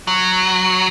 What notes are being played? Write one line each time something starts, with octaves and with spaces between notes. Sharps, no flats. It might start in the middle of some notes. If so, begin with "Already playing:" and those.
F#3